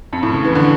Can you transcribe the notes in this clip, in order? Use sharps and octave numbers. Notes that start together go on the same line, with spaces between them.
F2
A2
C#3
E3
D3